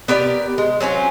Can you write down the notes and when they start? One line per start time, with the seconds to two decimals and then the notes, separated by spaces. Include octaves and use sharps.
0.08 B3 G4 A#4 D5
0.58 G#3
0.80 F#3 C4 C#4 F4